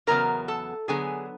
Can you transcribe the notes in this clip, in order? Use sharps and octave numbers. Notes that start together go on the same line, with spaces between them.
E2 C#3 F#3 B3 A#4 A#5
A4 A5
D3 F#3 B3 G#4 G#5